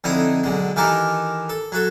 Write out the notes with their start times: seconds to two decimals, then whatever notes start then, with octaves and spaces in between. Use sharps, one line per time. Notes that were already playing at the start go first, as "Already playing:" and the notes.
0.04 F2 D3 D#4 E4 D#6
0.44 B1 D3 G#3
0.76 D#3 E3 G4 A4 A#4
1.49 A4
1.72 F#3 F#4 A4